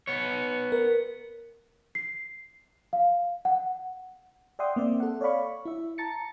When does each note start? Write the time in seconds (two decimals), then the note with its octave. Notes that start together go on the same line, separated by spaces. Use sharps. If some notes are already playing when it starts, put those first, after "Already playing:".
0.07 B3 C#5
0.72 A#4
1.95 C7
2.93 F5
3.45 F#5
4.59 D5 E5 F#5 G5 C6 D#6
4.76 A#3 C4 D5 E5
5.00 A4 F#5
5.21 C#5 D5 F5 B5 C#6
5.65 E4 E5
5.98 A5 A#5 A6 C#7